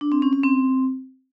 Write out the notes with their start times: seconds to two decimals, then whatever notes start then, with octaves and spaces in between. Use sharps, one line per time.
0.01 D4
0.12 C4
0.22 C#4
0.33 C#4
0.43 C4